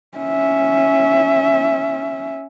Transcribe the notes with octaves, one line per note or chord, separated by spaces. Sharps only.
C#4 E5